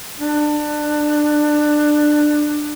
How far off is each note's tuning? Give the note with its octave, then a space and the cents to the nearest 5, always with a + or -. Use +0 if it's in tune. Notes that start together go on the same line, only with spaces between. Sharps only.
D4 +20